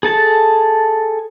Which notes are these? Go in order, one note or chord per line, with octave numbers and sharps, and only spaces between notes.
G#4 A4 A5